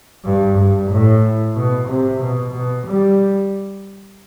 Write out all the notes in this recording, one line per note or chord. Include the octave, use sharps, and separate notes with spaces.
G2
G2
A2
B2
C3
B2
B2
G3